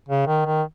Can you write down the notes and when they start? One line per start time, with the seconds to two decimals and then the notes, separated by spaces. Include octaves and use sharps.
0.09 C#3
0.27 D#3
0.46 D#3